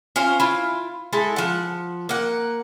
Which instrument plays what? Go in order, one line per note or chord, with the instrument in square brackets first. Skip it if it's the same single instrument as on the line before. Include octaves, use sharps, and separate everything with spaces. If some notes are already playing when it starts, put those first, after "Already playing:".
[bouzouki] C#4 F4 C5 F5
E4 F4
G#3 E4 A4
F3 F#5
A#3 F#5